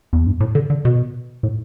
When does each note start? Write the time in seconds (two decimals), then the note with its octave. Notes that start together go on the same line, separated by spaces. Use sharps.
0.13 E2
0.27 G2
0.40 A2
0.55 D3
0.70 D3
0.85 B2
1.43 A2